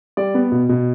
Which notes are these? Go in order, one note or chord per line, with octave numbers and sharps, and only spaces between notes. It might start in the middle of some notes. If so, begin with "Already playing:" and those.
G3 D5
B3
B2
B2